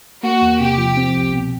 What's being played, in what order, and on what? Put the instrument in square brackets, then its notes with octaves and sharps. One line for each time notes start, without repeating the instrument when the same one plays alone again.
[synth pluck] A#3 [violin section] F#4
[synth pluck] E2
[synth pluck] C3 [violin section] G4
[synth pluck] F3
C4
C2
B2